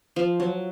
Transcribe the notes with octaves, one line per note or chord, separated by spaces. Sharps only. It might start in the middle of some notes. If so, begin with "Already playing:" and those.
F3
F#3